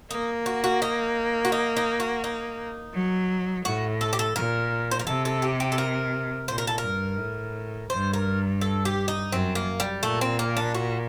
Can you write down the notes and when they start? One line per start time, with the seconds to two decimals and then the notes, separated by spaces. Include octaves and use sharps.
0.11 A#3 D#4
0.46 F#4
0.64 F#4
0.82 D#4
1.45 F#4
1.52 D#4
1.77 D#4
2.00 F#4
2.24 D#4
2.94 F#3
3.65 A2 F#4
4.01 A4
4.13 G4
4.19 A4
4.36 A#2 A#4
4.91 C5
5.00 A#4
5.07 C3 A4
5.25 A4
5.42 G4
5.60 G4
5.72 A4
5.78 A#4
6.48 A#2 C5
6.58 A#4
6.67 A4
6.78 A#4
6.84 G2
7.19 A2
7.90 G2 C5
8.13 A#4
8.61 A4
8.85 G4
9.08 D#4
9.32 F#2 C4
9.55 A#3
9.80 G3
10.03 A#2 A3
10.21 C4
10.39 A#3
10.57 D4
10.74 F#4